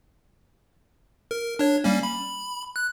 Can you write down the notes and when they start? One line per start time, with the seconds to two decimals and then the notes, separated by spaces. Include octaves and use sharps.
1.31 A#4
1.59 D4 C#5
1.84 G3 A#3 C#4
2.03 B5
2.76 F#6